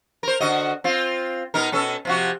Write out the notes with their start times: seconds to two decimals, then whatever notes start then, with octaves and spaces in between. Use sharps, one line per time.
0.23 A#4 C5
0.40 D3 F#4 D#5
0.84 C4 F4
1.54 B2 D#4 A#4
1.72 B2 C#4 A4
2.05 C3 F3 F#4